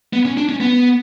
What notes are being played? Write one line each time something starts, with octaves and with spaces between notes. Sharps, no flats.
B3
C#4
D4
C#4
B3